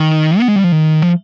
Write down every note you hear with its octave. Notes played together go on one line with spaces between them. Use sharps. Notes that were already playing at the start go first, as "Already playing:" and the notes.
Already playing: D#3
B3
G#3
G3
F3
D#3
F3